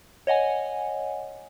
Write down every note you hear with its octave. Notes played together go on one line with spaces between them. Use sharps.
C#5 D#5 F#5 G#5